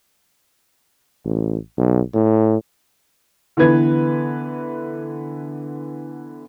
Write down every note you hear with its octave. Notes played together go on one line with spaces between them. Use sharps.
A1
B1
A2
D3 E3 B3 E4 B4 G#6